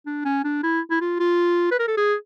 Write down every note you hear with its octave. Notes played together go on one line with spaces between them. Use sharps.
D4
C#4
D4
E4
E4
F4
F4
B4
A#4
A4
G#4